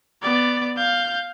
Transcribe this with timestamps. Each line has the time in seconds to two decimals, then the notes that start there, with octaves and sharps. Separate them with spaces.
0.22 B3 D5
0.77 F5 G6